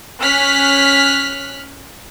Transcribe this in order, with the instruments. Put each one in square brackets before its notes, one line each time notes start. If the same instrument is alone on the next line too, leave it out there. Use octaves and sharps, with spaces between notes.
[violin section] C#4 F6 F#6 B6